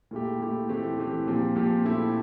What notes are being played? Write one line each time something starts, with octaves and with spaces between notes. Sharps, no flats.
A#2 A3 E4 G4
A#2 A3 E4 G4
E3 A3 C4 G4
E3 A3 C4 G4
A#2 F3 C4 G4
A#2 F3 C4 G4
A#2 A3 C4 E4 G4